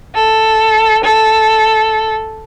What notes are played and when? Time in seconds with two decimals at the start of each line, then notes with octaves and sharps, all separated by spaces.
0.13 A4
1.05 A4